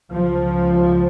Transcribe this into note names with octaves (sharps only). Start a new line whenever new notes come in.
C#2 C#3 F3